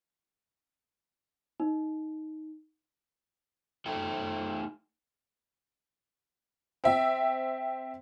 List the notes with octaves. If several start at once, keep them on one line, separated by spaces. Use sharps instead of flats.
D#4
A3 D#4 A4 G5
C4 E5